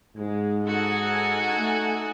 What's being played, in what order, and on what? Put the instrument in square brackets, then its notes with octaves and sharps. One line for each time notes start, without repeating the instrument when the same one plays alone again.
[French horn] G#2 [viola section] G#3
[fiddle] D#4 F#4 [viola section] A4 F#5 G#5
[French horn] A3